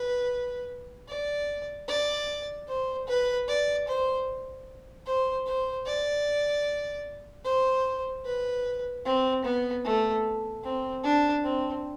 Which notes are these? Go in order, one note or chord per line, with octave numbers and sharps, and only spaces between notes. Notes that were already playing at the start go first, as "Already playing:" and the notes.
Already playing: B4
D5
D5
C5
B4
D5
C5
C5
C5
D5
C5
B4
C4
B3
A3
C4
D4
C4